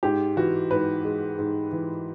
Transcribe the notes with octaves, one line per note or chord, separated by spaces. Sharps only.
G#2 G4
E3 F#4
G#2 B4
G#3
G#2
E3